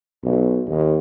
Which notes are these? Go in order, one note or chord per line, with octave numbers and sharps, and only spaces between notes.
B1
D#2